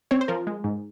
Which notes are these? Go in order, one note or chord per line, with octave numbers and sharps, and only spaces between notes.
C4 C#5
C5
F3 A#4
G#3
G#2